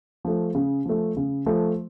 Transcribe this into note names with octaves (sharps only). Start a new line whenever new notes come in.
F3 A3
C#3
F3 A3
C#3
F3 A3